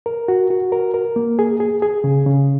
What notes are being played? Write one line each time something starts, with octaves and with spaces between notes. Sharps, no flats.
A#4
F#4
F#4
A#4
A#4
A#3
G#4
G#4
G#4
C#3
C#3